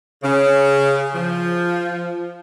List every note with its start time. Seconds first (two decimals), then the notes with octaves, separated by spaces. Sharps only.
0.23 C#3
1.14 F3